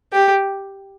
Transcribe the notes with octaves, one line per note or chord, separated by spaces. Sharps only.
G4